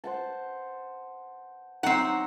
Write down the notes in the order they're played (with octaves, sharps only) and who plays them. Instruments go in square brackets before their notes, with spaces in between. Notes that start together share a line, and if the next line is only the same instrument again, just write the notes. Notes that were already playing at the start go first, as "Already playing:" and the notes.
[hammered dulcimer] C5 F#5 A5
[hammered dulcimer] F#3 D#4 [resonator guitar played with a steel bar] C4 F#5